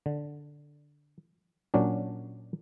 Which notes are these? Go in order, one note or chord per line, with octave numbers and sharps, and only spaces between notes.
D3
A#2 F#3 C#4 D4